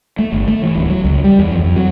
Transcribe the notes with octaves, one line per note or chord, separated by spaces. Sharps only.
A3
G1
A3
E3
D1
F#3
C#2
G3
E2
F2
F2
F#3